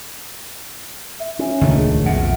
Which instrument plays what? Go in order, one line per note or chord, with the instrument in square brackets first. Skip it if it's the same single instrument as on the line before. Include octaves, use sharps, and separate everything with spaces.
[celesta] E5
[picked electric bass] C#4
[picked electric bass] D#1 A#2 D#3 [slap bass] C#2 A3 [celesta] D4 C#5
[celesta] G#4
[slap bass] B1 A#2 [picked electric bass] F2 [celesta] E5 F#5